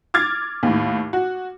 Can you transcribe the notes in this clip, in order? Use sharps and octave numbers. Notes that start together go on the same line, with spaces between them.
D6 F6 G#6 A6
D#2 A2
F#4